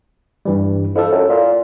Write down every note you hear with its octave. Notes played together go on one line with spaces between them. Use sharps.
G2 E3 G3
F2 E4 A4
F#2
A#2